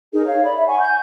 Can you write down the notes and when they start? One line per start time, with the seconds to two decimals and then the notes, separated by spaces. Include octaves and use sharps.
0.13 D#4 G#4 A#4
0.25 C#5 F5
0.43 D5 B5
0.55 E5
0.67 F#5 G#5 C#6
0.80 G6